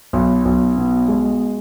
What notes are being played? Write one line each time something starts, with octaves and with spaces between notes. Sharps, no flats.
B1
B1
B2
G#3